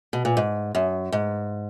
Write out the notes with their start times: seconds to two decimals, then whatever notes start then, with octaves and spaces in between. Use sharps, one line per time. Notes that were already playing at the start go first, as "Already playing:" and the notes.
0.13 B2
0.25 A#2
0.37 G#2
0.75 F#2
1.12 G#2